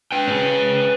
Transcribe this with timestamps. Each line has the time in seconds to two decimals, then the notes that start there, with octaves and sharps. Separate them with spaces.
0.12 B4 G5
0.28 C#4 G#4